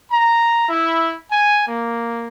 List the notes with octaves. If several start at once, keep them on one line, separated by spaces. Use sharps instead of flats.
A#5
E4
G#5
A#3